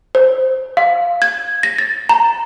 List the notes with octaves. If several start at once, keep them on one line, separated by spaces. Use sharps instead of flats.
C5
F5
G#6
A#6
A6
A#5